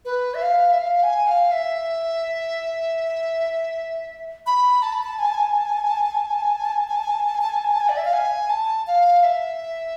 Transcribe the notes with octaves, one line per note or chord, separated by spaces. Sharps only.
B4
E5
F5
E5
F5
G#5
F5
E5
B5
A5
B5
A5
G#5
A5
G#5
A5
G#5
A5
G#5
A5
G#5
A5
G#5
A5
G#5
A5
G#5
A5
G#5
A5
G#5
A5
G#5
A5
G#5
A5
G#5
A5
G#5
A5
G#5
A5
G#5
A5
G#5
A5
G#5
D5
E5
F5
G#5
A5
F5
E5